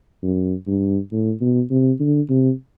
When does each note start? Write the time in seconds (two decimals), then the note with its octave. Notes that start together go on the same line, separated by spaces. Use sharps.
0.23 F#2
0.67 G2
1.12 A2
1.41 B2
1.71 C3
2.00 D3
2.30 C3